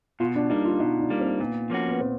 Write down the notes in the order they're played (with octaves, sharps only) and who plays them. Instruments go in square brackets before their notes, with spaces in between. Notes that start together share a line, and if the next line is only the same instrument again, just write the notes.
[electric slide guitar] B2 [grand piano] F4
[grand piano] D4
[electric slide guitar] G3 A#3 [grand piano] D#4
[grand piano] F4
[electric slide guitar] B2 [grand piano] D#4
[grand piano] D4
[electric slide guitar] G3 A#3
[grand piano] C4
[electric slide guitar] A#2 [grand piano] B3
[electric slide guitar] F3 A#3 C#4 F#4
[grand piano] B3
[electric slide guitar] A#2 [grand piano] C4